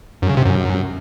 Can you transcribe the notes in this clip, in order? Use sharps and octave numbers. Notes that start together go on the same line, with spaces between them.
F#2
C#3
C3
F#2